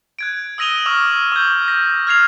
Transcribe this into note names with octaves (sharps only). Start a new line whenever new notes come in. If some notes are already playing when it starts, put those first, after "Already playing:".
F#6 G#6 D7
D#6 E6 A#6 D#7 F7 G7
C#6 D6 E6 F6
D6 G6
A#6
F6 G#6 C7 F7